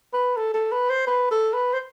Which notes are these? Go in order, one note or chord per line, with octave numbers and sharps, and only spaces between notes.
B4
A4
A4
B4
C5
B4
A4
B4
C5